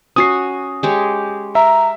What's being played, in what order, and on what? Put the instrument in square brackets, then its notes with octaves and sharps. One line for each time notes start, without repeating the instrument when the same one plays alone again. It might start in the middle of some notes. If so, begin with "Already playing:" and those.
[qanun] C#4 F#4 [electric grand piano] D#6 C7
[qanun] G#3 G4 C#5
[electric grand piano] E5 [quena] A#5